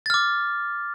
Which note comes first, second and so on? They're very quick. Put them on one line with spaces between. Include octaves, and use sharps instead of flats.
A6 F6 D6